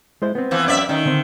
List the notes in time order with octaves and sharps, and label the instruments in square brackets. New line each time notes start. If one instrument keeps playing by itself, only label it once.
[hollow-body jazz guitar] G#3 E4 C5
B3 C4
[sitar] E3 F3
F#2 D5 E5
[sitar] D#3 [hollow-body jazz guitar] C#4 D#4 D#5
[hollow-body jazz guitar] D3 C4